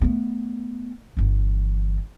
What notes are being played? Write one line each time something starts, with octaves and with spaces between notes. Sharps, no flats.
A3 B3
G1 E3